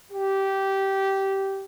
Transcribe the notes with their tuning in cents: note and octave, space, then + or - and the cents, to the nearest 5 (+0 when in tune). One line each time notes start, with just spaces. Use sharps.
G4 -15